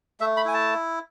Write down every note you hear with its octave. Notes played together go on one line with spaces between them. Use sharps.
A3 E5
B5
E4 G#5
A5